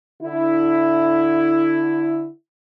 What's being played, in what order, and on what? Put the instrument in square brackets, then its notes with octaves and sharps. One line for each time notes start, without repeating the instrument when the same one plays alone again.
[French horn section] D3 E4